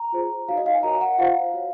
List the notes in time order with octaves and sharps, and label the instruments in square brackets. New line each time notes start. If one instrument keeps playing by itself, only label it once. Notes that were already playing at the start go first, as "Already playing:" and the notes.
Already playing: [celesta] A#5
F4 G#4 C5
D#4 F#4 C#5 F5
D#5
F5
G#5
F#4 A#4 C#5 A#5
F#5
F4 C5 F5
F#4 C#5